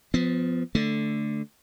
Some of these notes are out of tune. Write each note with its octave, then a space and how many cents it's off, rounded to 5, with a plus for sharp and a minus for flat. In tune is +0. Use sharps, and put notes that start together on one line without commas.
F3 +0 B3 +25
D3 +0 A3 +0